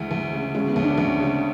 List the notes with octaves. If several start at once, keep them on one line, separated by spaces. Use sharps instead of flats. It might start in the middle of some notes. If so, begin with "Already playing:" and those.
Already playing: D2 E3 G#3
D2
C#3
G#3 C#4
B3
D2
D4
D2 C#4
C#3